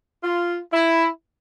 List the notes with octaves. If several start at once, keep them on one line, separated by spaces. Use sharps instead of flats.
F4
E4